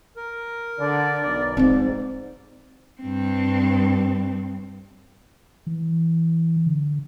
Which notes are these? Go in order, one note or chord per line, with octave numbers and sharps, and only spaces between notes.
A#4
D3 D5
B1
G#2 C4 F4 D5
G2 C4
E3
D3